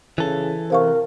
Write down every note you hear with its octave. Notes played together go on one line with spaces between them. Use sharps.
C#3 E3 A4
C3 A#4 C5 F5 C#6